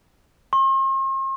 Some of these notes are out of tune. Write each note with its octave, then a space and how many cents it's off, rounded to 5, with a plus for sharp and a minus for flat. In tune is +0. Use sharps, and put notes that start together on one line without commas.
C6 +45